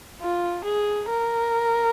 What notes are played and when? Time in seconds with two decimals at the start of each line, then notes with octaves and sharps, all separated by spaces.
0.21 F4
0.64 G#4
1.09 A#4